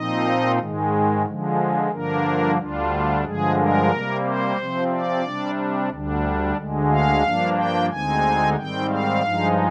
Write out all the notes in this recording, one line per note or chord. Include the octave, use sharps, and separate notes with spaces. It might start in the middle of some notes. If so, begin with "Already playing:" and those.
Already playing: A#2 F3 C4 D#4 D#5
G#2 D#3 G#3
D3 F3 G#3
G2 D3 F3 A#3 D4 A#4
D2 D3 G3 D4 F4
G2 D3 F3 G#3 G#4
A#4
C3 G3 A#3
C5
C3 F3 C4
D5
C3 G3 D4
D2 D3 G3 D4
D2 D3 G#3
F5
G2 F3 A#3 D4
G5
D2 D3 G#3 C4 D#4 G#5
G#2 D#3 G3 C4 G5
F5
G2 F3 G#3 D#4